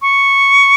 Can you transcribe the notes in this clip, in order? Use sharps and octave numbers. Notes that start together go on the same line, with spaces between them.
C#6